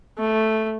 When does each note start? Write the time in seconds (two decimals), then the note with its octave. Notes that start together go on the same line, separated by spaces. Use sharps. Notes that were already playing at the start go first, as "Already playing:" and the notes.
0.18 A3